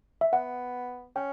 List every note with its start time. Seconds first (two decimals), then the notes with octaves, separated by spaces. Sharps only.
0.21 E5
0.33 B3 F#5
1.16 C#4 G5